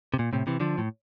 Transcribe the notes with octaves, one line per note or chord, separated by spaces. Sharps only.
C3
A#2
A2 C3
C3 E3
D3 F3
A2